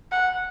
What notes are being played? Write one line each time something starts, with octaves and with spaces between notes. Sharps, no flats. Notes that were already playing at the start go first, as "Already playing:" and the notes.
F#5